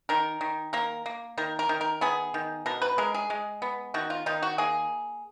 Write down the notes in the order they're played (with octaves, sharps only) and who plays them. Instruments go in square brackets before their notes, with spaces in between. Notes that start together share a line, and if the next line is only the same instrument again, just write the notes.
[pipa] D#3 A#4
D#3
A#3 A#4
A#3
D#3 A#4
A#4
D#3
A#4
B3 G#4
D#3
B2 A#4
B4
G#3 A#4
G#4
G#3
B3
D#3 F#4
F4
D#3 D#4
F#4
A#3 G#4